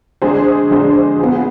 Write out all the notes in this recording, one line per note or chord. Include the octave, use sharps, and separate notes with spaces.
D3 G#3 D4 G#4 C5
D3 G#3 D4 G#4 C5
B3 F4 G#4